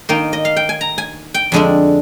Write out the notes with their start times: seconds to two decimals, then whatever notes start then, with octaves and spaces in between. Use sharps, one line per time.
0.09 D#3 A#3 D#4 G5
0.33 D#5
0.45 F5
0.56 G5
0.69 G#5
0.81 A#5
0.98 G#5
1.34 G5
1.52 F2 D3 G#3 D4